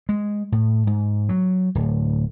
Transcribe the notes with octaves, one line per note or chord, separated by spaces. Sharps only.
G#3
A2
G#2
F#3
D1